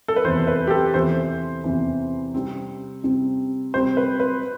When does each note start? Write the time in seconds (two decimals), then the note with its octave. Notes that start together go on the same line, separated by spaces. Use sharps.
0.08 A4
0.16 B4
0.25 E2 C3 E3 C5
0.47 B4
0.67 G4
0.70 A4
0.94 E2 C3 E3 C5
1.64 E2 C3 E3
2.34 C3 G3 C4
3.03 C3 G3 C4
3.74 C3 G3 C4 C5
3.97 B4
4.20 B4